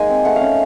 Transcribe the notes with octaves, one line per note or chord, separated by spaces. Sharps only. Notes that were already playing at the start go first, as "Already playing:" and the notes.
Already playing: G#3 A#3 D#4 G#5
C4
A3 F#5
F5
C#4